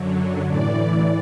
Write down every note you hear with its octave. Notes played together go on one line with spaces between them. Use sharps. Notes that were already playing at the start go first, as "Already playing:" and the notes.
Already playing: F#2 D3 F#3
A2 E3 D5